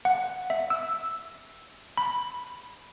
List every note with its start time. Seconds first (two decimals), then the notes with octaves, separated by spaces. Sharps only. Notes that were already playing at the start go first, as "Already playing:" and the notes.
0.05 F#5
0.50 E5
0.70 E6
1.97 B5